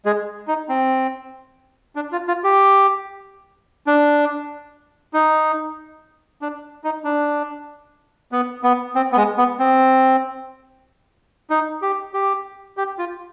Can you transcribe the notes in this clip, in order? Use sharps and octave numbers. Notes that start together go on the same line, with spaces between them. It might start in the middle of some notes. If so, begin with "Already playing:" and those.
G#3 G#4
D#4
C4
D4
F4
F4
G4
D4
D#4
D4
D#4
D4
B3
B3
C4
B3
G#3
B3
C4
D#4
G4
G4
G4
F4